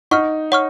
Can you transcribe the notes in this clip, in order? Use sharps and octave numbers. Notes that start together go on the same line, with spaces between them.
D#4 F#5 C#6 F6
C#5 F#5 C#6 F6